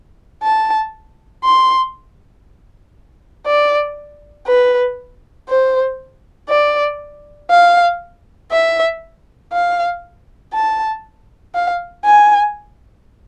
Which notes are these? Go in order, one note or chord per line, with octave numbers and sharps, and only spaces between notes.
A5
C6
D5
B4
C5
D5
F5
E5
F5
A5
F5
G#5